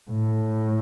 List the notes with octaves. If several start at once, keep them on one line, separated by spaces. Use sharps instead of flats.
A2